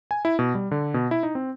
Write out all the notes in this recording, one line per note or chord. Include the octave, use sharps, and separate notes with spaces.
G#5
E4
B2
G3
D3
B2
E4
D#4
C4